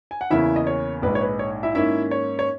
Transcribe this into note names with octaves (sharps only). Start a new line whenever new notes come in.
G#5
F#5
E2 C#3 E3 A#3 C#4 E4 E5
D#5
C#5
A#1 G#2 D#3 G#3 B4
C#5
B4
C#5
E4 E5
G#2 D#3 A#3 C#4 E4 E5
C#5
C#5